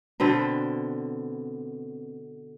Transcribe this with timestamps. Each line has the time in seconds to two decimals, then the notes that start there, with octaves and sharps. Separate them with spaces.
0.20 B2 D3 C4 B4